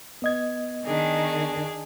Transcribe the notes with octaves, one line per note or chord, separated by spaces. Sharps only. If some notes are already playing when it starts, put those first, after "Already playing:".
B3 D#5 G#6
D#3 D4 G#4